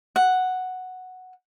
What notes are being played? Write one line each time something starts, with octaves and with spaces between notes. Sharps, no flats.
F#5